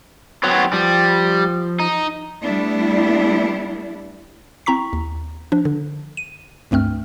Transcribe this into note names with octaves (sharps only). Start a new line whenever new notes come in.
F#3 B3 C4 C#5
F3 G3
D#4
G3 A3 B3 D4 E4
C4 E4 A#5 C#6 B6
D#2
F3 D4
D3
D#7
C#2 G2 A3 C4 F6